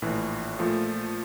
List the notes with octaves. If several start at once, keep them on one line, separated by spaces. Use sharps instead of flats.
A#1 A2 E3
A#2 F3 A3